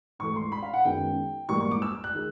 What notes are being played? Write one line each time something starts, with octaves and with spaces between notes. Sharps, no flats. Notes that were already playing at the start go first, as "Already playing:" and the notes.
G#2 E3 A3 C#6
C6
B5
F5
F#5
F#2 D#3 G#3 B3 G5
G#2 E3 G3 A#3 C#6
C#6
D6
E6
F#6
D#3 G#3